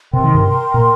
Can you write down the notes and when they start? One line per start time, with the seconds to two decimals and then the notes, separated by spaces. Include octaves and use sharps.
0.13 C3 A#4 G5 C6
0.24 D#3
0.35 G2 C3
0.74 A#2